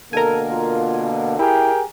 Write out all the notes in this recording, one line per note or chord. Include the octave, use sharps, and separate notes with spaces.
B2 D3 A#3 A4 A#4 G#5
F4
E4 G4 G#4 A#4 G5